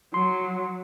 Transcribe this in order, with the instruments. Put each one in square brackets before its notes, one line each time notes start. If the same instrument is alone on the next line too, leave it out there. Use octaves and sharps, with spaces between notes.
[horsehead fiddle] F#3 [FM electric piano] C6